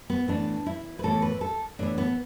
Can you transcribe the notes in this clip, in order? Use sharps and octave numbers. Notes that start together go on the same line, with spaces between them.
B3
A2 E3 B3 D4
E4
B4
A2 E3 B3 A4
B4
A4
A2 E3 B3 D4
B3